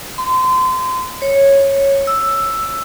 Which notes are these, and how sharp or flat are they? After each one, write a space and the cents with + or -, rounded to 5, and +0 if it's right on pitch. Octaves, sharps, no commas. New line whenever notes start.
C6 -30
C#5 -10
E6 +5